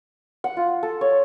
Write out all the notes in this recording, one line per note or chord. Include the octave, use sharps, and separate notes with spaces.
F#5
F4
A4
C#5